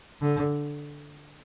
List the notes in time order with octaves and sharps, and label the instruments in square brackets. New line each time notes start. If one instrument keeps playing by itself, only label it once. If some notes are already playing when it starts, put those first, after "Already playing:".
[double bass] D3